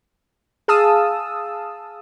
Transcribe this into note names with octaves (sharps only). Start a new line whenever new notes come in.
G#4 F5 A5 D#6 E6